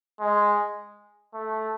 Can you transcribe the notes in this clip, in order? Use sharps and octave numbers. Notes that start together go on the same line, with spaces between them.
G#3
A3